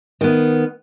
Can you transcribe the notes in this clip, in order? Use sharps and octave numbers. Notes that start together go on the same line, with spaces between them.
D#3 B3